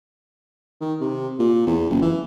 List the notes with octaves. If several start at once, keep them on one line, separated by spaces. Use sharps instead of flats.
D#3
C3
A#2
E2
F#1
E3